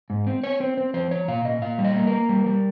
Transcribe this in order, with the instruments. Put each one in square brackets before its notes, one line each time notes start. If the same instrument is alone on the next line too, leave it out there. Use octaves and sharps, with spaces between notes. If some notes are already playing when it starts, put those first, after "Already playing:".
[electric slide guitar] G#2
C4
C4 C#5
C4 C5
C4 C5
F3 C5
F3 C#5
A#2 F5
A#2 D#5
A#2 F5
G3
D#5
A#3
A#4
A#3
G3
G3